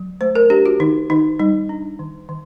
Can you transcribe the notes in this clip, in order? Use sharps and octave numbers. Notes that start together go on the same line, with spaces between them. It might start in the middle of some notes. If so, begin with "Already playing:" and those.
Already playing: F#3
A3 C5
A#4
D4 G4
F#4
D#3 D#4
D#3 D#4
G3 D#4
D4
D#3
D#3